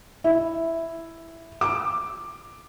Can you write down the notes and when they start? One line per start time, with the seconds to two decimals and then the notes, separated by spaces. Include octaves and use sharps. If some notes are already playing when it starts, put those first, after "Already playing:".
0.24 E4
1.61 D6